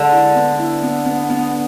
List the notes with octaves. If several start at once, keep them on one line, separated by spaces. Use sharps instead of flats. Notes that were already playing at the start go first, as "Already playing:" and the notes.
Already playing: D3 G#3
E4
B3
E4
B3
B3
B3